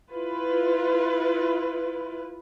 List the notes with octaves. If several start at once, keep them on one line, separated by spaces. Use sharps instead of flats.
E4 F4 B4